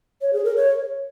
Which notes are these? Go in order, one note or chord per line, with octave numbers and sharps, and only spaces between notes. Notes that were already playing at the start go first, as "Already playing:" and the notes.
C#5
G#4
A#4
C#5